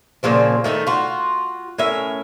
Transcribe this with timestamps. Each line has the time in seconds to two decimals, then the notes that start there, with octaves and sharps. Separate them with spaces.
0.23 A#2 C#3 F3 C4
0.64 D#3 A3 C#4 D#4
0.87 F4 F#4
1.78 A2 C#4 A#4 E5